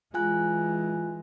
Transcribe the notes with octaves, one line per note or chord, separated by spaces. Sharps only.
E3 G#3 F4 G#5 F#6